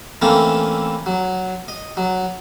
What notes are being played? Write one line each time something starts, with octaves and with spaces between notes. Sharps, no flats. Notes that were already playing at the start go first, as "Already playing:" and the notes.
E3 A3 A#3 C4 C#4
F#3
D#5
F#3